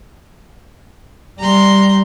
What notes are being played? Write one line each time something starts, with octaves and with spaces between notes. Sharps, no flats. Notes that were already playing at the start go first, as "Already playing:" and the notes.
G3 A#5 C6